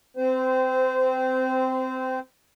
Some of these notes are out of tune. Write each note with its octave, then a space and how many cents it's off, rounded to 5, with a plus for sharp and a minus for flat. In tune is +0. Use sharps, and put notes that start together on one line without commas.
C4 -10 C5 -25